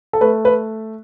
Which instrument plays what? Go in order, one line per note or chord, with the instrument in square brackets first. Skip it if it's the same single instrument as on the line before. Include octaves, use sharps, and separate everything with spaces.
[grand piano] A4
A3 B4
B4